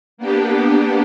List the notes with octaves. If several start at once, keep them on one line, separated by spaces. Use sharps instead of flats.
A#3 B3 D4 G4